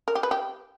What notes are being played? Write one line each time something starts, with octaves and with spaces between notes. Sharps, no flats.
A#4
G4
B4
G4